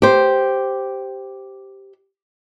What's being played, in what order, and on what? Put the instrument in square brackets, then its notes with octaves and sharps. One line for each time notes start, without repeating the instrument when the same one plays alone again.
[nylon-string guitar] G4 C5